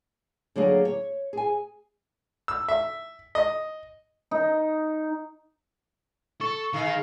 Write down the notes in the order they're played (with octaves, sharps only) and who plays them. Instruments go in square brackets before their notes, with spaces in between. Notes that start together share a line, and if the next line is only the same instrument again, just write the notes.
[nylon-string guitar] D3 F#3 A#3 G#4
C#5
G#4 G#5
[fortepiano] E6
E5
D#5
[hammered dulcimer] D#4
[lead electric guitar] A4 [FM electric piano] C#6
[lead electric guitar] D#3 [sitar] D#4 G#4 B4 [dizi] F5